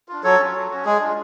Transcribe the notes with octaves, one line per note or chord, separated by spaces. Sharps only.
D4 F4
F#3 A4 C#5
C#4 F4
F#3
C#4 F#4
G#3 G#4
D4 F4